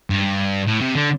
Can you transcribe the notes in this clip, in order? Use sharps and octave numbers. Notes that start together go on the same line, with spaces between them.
G2
A2
C3
D3